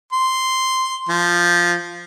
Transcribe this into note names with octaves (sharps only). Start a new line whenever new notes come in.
C6
F3